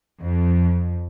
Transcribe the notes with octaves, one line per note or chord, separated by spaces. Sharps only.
F2